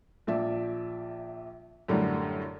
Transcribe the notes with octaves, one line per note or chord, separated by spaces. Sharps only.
A#1 F3 D5 E5
F#2 A2 D3 G3